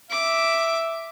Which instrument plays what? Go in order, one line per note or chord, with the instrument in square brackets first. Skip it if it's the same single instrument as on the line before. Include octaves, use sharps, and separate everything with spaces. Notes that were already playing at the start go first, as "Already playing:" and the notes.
[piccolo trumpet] E5 [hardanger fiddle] D6